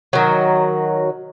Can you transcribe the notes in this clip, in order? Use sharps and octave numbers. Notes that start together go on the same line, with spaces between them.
D#3 F#3